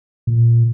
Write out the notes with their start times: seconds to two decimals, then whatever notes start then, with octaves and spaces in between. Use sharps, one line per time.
0.27 A#2